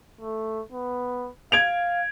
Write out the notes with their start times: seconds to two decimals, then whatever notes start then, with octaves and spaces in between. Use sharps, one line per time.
0.21 A3
0.72 B3
1.52 F5 G#6 D7 F7